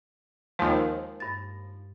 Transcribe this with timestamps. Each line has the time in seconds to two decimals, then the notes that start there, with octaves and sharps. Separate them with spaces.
0.59 D#2 F3 G#3 F6
1.20 G2 A6